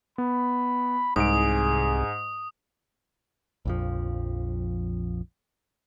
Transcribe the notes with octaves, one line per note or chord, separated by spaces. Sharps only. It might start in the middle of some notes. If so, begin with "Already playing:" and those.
B3 B5
C2 G#2 G#4 D#6 D7
A#1 F2 F3